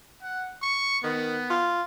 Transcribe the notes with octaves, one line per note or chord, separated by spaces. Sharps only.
F#5
C#6
D#3 B3
F4